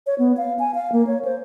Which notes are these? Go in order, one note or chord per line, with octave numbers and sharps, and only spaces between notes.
C#5
B3
F5
G#5
F5
A#3
C#5
C5